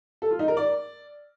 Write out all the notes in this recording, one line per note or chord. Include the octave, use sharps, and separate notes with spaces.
A4
F4
D#4
A#4
D5